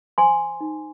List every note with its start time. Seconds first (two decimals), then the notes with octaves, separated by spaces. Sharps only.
0.18 C5 G#5 C6
0.61 D#4